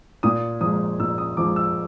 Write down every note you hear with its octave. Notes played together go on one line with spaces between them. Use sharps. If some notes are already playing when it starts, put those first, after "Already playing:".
A#2 D#6
F3 G#3 D#6
A#2 E6
D#6
F3 G#3 D6
E6